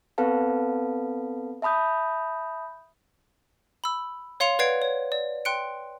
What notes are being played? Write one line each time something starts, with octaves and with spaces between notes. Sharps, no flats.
B3 C4 A4 B4 F5 A5
E5 A5 B5 D#6 G6
B5 E6
C#5 F5 C6 C#7 F7
B4 D5 F#5 G#6 C7 D7
C#5
D5
G5 C6 F#6 C#7 D7